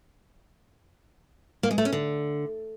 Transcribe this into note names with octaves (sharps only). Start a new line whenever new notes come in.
A#3
G#3
A3
C#4
D3